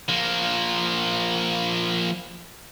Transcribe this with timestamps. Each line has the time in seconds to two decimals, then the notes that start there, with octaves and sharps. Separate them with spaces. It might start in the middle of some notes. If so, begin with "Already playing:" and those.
0.09 F3 A#3